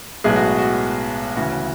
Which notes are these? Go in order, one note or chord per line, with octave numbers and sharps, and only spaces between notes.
B1 A2 G#3 B3 G#4
F#4
F#4
D2 C#3 E3 F#4